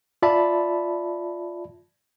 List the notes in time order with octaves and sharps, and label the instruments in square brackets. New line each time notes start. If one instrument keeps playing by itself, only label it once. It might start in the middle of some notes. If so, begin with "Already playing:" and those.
[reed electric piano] F4 D5 E5 A5 B5